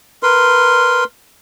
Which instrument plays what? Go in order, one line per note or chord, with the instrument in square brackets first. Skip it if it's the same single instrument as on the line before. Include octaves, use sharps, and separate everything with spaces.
[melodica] A#4 B4 C6